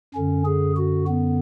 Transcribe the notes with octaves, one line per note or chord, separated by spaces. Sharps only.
F#2 D3 C#4
G#4
F#4
B3